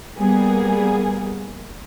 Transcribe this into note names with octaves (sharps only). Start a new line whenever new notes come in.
G3 A#3 B3 G#4